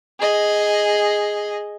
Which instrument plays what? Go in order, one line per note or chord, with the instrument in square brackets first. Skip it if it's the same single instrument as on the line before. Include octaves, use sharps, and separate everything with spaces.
[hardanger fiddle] G#4 D#5